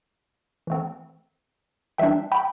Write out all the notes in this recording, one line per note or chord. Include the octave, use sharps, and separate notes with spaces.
E3 A3 C4
E3 G3 D4 E5 G5
G5 B5